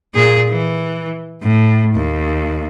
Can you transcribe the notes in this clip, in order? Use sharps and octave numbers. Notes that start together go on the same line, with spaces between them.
A#2 G#4
E3
A2
D#2